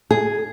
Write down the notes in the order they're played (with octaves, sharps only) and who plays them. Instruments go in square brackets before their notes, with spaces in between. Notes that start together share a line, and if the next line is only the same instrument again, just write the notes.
[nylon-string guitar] G#4